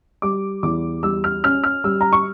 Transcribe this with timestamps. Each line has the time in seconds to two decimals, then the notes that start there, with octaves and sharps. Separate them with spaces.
0.22 G3 D6
0.63 E2 D6
1.03 G3 E6
1.24 F6
1.44 C#4 F6
1.64 F6
1.84 G3 E6
2.01 A#5
2.13 C#6